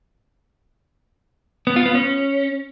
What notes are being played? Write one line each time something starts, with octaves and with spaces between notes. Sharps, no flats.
B3
F4
B3
C#4